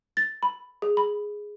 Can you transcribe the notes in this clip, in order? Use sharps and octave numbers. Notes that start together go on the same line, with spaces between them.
A6
B5
G#4
B5